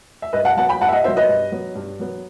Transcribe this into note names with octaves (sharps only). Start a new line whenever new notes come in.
E5
G2 B4 D#5
F#5 A5
F#3 B3 F#5 A5
G5 B5
G2 F#5 A5
E5
D#5 F#5
F#3 B3 C5 E5
B4 D#5
G2
F#3 B3
G2
F#3 B3